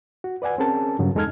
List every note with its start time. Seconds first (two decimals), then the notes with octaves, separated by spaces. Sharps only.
0.24 F#4
0.42 B4 D5 F#5 G#5
0.58 C4 C#4 G#4 A#4 A5
0.99 G2 C#3 F#3
1.15 E2 G#3 D#4 A4 F6 G#6